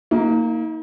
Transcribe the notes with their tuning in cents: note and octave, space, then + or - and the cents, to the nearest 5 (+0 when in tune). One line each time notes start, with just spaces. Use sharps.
A#3 -10 D#4 +40